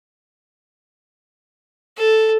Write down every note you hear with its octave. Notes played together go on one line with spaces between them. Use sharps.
A4